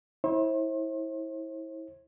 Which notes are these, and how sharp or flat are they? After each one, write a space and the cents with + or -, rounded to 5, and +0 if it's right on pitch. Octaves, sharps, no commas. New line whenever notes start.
E4 -25 C5 +40